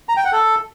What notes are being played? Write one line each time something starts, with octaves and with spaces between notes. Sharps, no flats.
A#5
G5
F#5
A4